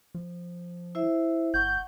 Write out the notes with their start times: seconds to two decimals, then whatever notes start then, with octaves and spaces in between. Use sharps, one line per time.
0.15 F3
0.95 E4 C5 E5
1.54 G1 F#5 C#6 G6